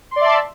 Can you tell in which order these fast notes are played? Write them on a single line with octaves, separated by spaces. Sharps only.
C6 D5 E5 A5